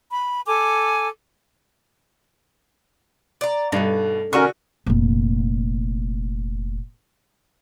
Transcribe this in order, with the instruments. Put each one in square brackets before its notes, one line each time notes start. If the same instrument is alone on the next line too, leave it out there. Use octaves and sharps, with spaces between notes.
[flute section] B5
A4 G#5 D6
[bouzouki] D5 A#5
[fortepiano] G2 [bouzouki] B2 [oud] A3 D#4
[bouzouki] D3 [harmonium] C#4 A#4 [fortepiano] F#4 C#6
[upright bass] F1 A#2